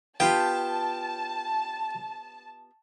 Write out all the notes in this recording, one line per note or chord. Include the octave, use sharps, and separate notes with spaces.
B3 F4 G4 G5 A5